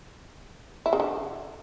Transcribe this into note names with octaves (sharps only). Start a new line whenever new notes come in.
E4
C#3
D3